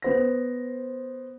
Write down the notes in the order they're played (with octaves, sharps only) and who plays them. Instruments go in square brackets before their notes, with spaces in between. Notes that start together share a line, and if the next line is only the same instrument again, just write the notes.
[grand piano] B3 C5 A#6